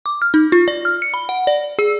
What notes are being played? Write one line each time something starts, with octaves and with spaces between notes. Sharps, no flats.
D6
F6
D#4
F4
D5
F6
C#7
B5
F#5
D5
G#4